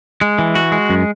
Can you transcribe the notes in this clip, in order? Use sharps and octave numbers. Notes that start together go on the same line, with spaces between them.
G#3
E3
F#4
G#3
F#2